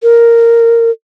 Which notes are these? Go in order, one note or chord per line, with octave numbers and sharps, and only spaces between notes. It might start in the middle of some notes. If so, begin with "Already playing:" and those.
A#4